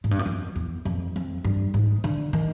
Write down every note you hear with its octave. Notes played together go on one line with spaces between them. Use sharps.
G#2
G2
F#2
F2
E2
F2
F2
G2
G#2
D3
D#3